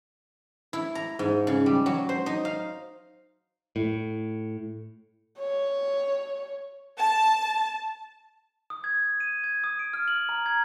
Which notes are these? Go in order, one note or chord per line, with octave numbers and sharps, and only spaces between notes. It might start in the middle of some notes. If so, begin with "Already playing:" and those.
E4
A#5
G#2
C#3
G3
F#3
C5
D#4
F5
A2
C#5
A5
D#6
G#6
D#7
G#6
D#6
D7
F6
F#7
A#5
G#6